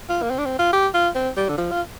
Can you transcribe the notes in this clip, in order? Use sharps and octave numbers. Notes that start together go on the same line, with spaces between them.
F4
A#3
C4
D4
C4
F4
G4
F4
C4
G3
D3
F3
F4